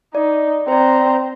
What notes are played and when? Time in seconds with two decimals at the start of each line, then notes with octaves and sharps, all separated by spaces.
0.15 D#4 D5
0.68 C4 C5 D5 A#5